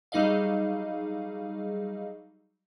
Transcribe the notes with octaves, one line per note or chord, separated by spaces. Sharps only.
F#3 G3 D#4 G#4 D#5 F5